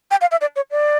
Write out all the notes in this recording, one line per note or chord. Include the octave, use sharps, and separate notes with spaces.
G5
F5
E5
D5
C#5
D5